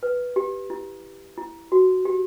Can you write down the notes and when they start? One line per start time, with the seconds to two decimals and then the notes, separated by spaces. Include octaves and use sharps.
0.03 B4
0.36 G4
0.70 E4
1.38 E4
1.72 F#4
2.05 G4